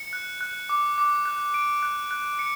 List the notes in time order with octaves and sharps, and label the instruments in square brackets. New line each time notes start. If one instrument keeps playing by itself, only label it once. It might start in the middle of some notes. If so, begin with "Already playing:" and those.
Already playing: [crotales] C#7
F#6
F#6
D6
D6
F#6
D7
F#6
F#6
C#7